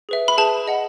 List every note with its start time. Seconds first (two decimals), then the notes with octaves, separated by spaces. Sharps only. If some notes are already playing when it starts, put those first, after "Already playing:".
0.09 G#4 B4 E5
0.28 B5
0.38 G#4 B4 E5 A5
0.67 G#4 D#5 F#5